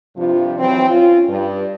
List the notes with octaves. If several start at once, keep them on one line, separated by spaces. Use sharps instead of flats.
G2 C3 F3 F4
E3 F#3 C4
C#4 F4
G2